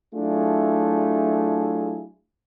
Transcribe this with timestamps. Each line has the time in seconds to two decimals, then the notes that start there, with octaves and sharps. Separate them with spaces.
0.15 F#3 A3 D4 E4 F4 G#4